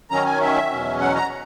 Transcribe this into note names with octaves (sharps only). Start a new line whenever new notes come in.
D#3 F#3 C#4 A#5
G#5
E5
E2 B2 F#3 C#4
F#5
A#5